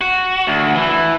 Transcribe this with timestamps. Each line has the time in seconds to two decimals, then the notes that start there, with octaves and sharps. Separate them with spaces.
0.01 F#4
0.47 D2
0.75 E3